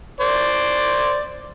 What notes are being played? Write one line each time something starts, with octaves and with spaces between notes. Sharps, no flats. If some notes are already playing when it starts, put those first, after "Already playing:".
C5 D5